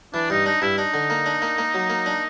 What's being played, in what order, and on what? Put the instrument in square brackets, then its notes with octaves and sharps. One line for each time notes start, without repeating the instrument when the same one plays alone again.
[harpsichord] E3 [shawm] D4
[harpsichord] G2 [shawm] D#4
[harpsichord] D4 [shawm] D#4
[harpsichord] G2 [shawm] E4
[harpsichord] D4 [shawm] D#4
[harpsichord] D3
A#3
D4
A#3
A#3
F#3
A#3
D4